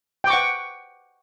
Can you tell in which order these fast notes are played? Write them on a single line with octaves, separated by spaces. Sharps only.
G5 D6 C#6 F#5